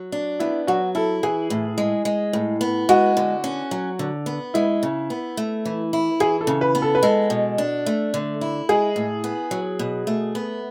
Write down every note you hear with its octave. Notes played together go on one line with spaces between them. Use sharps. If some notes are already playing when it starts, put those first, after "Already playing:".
Already playing: F#3
D4
B3 E4
F#3 F#4
E4 A4
E3 G#4
A2
G#3
G#3
A2
B3
G#3 F#4
D3
C#4
F#3
D3
B3
G#3 E4
C#3
B3
A3
E3
E4
E3 G#4
A4
C#3
B4
B3
A4
B4
G#3 A4
B2
D4
A3
D3
E4
G#3 G#4
A2
B3
F#3
B2
A3
B3